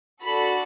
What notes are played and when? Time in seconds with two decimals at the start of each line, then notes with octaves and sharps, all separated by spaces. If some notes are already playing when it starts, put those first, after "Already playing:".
0.22 D4 F#4 A4 B5